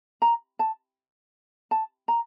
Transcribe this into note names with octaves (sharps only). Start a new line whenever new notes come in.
A#5
A5
A5
A#5